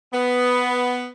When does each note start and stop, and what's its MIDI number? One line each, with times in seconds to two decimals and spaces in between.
0.13 1.07 59